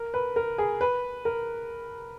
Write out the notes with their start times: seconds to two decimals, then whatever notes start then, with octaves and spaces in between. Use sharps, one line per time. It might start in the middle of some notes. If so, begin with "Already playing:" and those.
Already playing: A#4
0.14 B4
0.36 A#4
0.58 G#4
0.81 B4
1.25 A#4